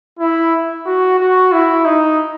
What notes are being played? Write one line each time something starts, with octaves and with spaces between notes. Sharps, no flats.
E4
F#4
F#4
E4
D#4